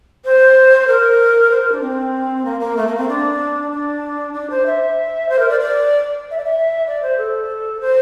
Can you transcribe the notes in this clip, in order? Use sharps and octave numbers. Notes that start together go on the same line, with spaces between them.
C5
A#4
C5
A#4
D4
C4
A#3
A#3
A3
A#3
C4
D4
D4
D4
C5
E5
C5
A#4
D5
D5
E5
D5
E5
D5
C5
A4
C5